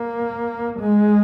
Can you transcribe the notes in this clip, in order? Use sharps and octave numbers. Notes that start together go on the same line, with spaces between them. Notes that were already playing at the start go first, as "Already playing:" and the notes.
Already playing: A#3
G#3